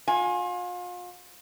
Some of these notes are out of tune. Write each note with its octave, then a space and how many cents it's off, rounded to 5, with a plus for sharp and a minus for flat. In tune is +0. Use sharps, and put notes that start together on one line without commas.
F4 +35 G#5 +0